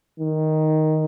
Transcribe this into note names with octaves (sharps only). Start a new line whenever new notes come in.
D#3